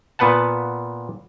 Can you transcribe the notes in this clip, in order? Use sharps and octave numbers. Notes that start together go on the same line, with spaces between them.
A#2 B3 B4 F#5 A5